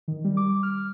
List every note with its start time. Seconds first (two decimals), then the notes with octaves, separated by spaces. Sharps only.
0.08 D#3
0.25 G3
0.37 D6
0.63 F6